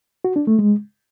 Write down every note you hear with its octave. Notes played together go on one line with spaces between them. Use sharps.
F#4
D4
A3
G#3